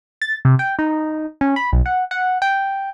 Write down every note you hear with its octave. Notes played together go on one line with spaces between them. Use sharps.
A6
C3
G5
D#4
C#4
B5
B1
F#5
F#5
G5